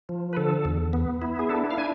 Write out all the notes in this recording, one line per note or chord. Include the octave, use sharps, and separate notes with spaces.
F3
B4
D3 A4
E2
B3
E4
G#4
D4 A4
F5
D4 G#5